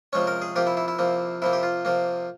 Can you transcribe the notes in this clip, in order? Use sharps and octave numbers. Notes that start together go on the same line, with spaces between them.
C3 F3 G#3 C#4 C#5
A#4
G#4
C3 F3 A#3 G4
E4
E4
E4
C3 F3 A#3
C3 F3 A#3 E4
G4
F4
C3 F3 A#3